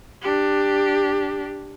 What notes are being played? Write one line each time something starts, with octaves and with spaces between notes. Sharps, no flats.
D4 G4